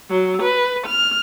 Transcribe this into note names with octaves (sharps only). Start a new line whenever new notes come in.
F#3
B4
F6